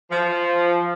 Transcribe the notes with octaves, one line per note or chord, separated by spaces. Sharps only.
F3